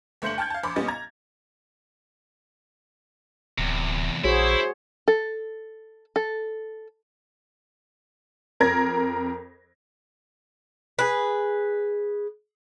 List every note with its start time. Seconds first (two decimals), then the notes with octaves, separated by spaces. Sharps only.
0.22 G1 A3 C5 G6 C#7 F#7
0.38 G5 A5 F6 G6 G#6
0.50 F5 A5
0.63 A#1 C5 B5 D6
0.76 A#2 G3 B3 C#4 D#5 A6
0.88 A#5 G#6
3.58 D1 E2 C3
4.24 A#1 E4 F#4 G#4 C5 C#5
5.08 A4
6.16 A4
8.60 F2 A#4 G#6 A#6
10.99 G#4 B4